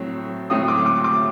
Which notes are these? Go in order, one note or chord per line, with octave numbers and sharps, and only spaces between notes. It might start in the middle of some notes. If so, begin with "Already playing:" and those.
Already playing: A2 F#3 A3 C4
A2 F#3 A3 C4 D#6
D6
D6
D6